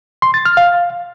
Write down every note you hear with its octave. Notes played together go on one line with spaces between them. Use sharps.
C6
A6
F6
F5